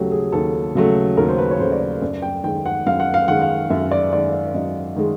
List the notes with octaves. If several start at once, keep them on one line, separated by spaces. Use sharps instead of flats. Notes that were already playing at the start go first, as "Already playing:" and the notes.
Already playing: D#2 C#3 F#3 A3 G4 A4
G#4
D#2 A4
C#3 F#3 A3
D#2 A#4
C5
B4
C#5
C#3 F#3 A3 C5
D5
C#5
F#2 D5
G5
D#3 G#3 G5
F#5
F#2 F5
F#5
F5
D#3 G#3 F#5
F5
F#2 E5
D5
D#3 G#3 D5
D5
F#2 D#5
D#3 G#3